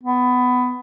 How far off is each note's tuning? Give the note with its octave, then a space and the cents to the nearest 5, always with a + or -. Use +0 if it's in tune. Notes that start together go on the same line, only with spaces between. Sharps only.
B3 +15